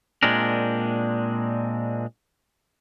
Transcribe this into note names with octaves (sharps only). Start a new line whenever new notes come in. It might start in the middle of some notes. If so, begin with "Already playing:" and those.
A#2 G#3 C4 D4 A#4